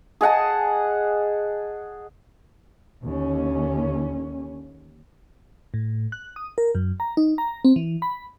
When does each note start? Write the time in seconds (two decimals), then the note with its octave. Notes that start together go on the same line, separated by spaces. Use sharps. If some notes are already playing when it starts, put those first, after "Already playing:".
0.21 G#4 D#5 F#5 A5
3.04 D#2 D3 C#4
5.74 A2
6.12 F#6
6.36 D#6
6.58 A#4
6.75 F#2
7.00 A#5
7.17 D#4
7.38 A#5
7.65 C4
7.76 E3
8.02 B5